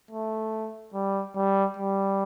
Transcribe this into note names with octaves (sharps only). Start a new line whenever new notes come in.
A3
G3
G3
G3